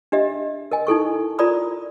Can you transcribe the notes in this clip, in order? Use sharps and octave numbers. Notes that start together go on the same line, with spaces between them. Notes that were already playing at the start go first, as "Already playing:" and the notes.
D4 G4 D#5 E5
A#4 D#5 G#5
D#4 E4 A4 C#6
F4 A#4 D5 A#5 B5 D#6